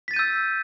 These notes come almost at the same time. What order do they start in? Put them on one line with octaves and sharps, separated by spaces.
B6 A6 D#7 G6 E6